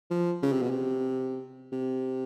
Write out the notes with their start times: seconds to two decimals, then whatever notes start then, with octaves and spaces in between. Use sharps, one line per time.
0.11 F3
0.43 C#3
0.52 C3
0.62 B2
0.70 C3
1.72 C3